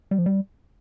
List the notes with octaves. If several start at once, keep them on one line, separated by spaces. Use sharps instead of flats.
G3
F3
G3